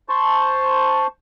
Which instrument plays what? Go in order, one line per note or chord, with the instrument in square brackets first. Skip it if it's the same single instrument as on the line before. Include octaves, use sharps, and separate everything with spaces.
[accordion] C5 A5 C#6